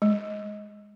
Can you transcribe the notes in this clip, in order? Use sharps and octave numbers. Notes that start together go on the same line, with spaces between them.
G#3